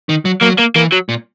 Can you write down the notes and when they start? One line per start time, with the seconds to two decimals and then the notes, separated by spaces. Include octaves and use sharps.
0.09 D#3
0.25 F#3
0.42 F#3 A#3
0.59 A#3
0.76 E3 A#3
0.92 F#3
1.09 A#2